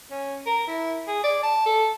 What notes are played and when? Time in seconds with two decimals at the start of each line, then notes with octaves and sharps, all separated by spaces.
0.11 C#4
0.46 A#4
0.68 E4
1.08 G#4
1.24 D5
1.43 A5
1.66 A4